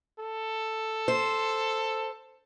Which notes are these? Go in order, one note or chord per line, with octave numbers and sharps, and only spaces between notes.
A4
C5